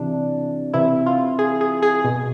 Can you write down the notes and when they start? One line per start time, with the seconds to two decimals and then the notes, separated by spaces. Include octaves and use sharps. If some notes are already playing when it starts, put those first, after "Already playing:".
Already playing: C3 E3 D4
0.74 C3 E3 E4
1.06 F4
1.39 G#4
1.61 G#4
1.82 G#4
2.04 B2